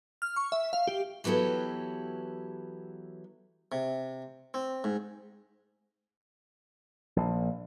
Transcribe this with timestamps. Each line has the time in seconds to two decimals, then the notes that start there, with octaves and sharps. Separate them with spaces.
0.22 F6
0.36 C#6
0.52 E5
0.73 F5
0.87 G4
1.24 E3 F#3 B3 G4 A4
3.72 C3
4.54 C4
4.84 G#2
7.16 A#1